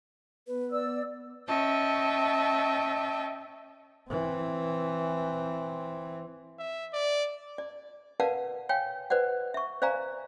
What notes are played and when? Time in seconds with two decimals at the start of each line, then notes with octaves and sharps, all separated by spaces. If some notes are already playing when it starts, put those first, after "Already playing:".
0.47 B3 B4
0.72 D5 E6
1.47 C#4 D#5 E5 G5 A5
4.10 E3 C4
6.59 E5
6.93 D5
7.58 D5
8.20 A#4 B4 D5 F5 F#5 A5
8.69 C#5 F5 G5 G#5
9.10 B4 C5 D5 F#5
9.54 E5 C#6
9.82 C5 D5 F5 G#5 A#5